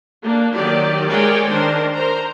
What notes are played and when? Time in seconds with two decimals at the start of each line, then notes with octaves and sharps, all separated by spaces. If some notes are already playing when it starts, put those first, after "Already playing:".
0.22 A#3 D4
0.54 D#3 F#3 G4 D5
1.10 G#3 G#4 A#4 C#5 D5 G5
1.48 D#3 D4 A#4 C5
1.96 A#4 C5 A#5